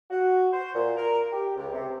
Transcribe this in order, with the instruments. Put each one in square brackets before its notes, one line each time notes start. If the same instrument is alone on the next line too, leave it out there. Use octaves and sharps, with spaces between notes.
[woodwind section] F#4
C5
A#2
A#4
G4
C#2
C3